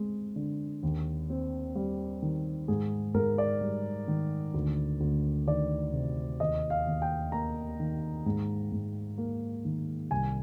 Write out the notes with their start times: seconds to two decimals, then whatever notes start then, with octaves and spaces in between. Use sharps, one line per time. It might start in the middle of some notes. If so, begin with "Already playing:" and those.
Already playing: G#3 C4
0.36 D3
0.83 D#2
1.30 C4
1.76 G3
2.22 D#3
2.68 G#2 G#4
3.14 G#2 A#4
3.38 D5
3.61 G3
4.08 D#3
4.54 D2
5.00 D2
5.47 D#3 D5
5.93 C3
6.40 D#2 D#5
6.70 F5
6.87 D#2
7.02 G5
7.32 A#3 A#5
7.80 D#3
8.26 G#2
8.72 G#2
9.18 A#3
9.65 D#3
10.11 C2 G#5